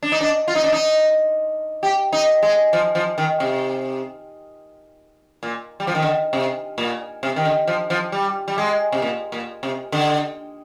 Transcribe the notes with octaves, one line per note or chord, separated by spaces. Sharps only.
D4
D#4
D4
F4
D#4
D4
D#4
G4
D#4
G#3
F3
F3
D#3
C3
A#2
G3
F3
D#3
D3
C3
A#2
C3
D#3
D3
F3
F3
G3
G3
G#3
C3
A#2
A#2
C3
D3